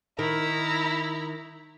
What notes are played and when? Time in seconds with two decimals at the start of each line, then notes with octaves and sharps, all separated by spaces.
0.19 D#3 E4 A#5